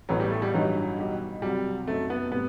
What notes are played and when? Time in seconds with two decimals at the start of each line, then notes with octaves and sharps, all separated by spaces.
0.09 A1 A2 E3 F#3 B3
0.20 G3
0.30 A3
0.42 G3
0.53 A1 G2 E3 F#3 G3 D#4
0.98 B2 G3 D#4 G4
1.42 C2 C3 F#3 G3
1.87 F#2 F#3 A3 C4 D#4
2.10 B3
2.32 A2 G3 B3 C4